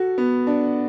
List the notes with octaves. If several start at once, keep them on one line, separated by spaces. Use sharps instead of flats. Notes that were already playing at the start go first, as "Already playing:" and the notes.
Already playing: F#4 A4
B3
D4